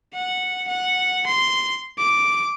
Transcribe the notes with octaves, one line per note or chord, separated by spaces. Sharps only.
F#5
F#5
C6
D6